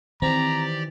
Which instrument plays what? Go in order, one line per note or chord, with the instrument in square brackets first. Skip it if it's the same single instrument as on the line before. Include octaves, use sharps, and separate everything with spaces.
[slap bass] D#3 E3 [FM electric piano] C4 [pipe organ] G4 D5 [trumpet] A#5